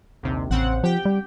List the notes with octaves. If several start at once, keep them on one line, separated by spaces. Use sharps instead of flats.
A#1 D#2 C3
A1 C#3 C4 F#5
F3 G4 G5
G3